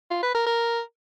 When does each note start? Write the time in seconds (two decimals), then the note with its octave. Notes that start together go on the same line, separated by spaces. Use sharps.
0.11 F4
0.23 B4
0.35 A#4
0.46 A#4